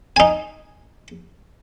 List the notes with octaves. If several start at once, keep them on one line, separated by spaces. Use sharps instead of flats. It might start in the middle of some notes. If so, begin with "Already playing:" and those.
D#4 G#5